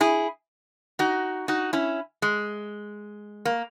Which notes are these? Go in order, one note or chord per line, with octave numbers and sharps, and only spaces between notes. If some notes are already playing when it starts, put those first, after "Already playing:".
E4 G#4
D#4 F#4
D#4 F#4
C#4 E4
G#3
A#3